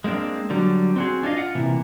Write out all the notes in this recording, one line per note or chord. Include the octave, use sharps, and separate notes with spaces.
G#3 A#3 C4 D4
D3 F#3 G3
C4 F#4 G#4
D4 F4 G#4 D#5 F5
F4 F#5
C3 E3 A#3